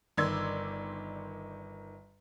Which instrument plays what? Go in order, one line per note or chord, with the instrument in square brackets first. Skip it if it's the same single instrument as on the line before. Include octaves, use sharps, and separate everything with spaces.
[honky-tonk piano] G1 D#3 D5 C6 E6 G#6